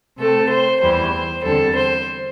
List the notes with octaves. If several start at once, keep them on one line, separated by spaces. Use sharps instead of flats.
C3 A3 C4 A4
C5
E2 E3 G3 C5
E2 D3 G3 C4 A4
C5